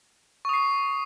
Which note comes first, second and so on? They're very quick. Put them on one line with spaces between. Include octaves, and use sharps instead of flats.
C#6 D#6 C7